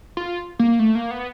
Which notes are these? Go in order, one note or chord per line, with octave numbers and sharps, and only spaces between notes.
F4
A#3
A3
A#3
B3